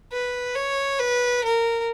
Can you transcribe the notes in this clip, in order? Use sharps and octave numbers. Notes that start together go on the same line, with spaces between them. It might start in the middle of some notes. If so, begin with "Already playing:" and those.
B4
C#5
B4
A#4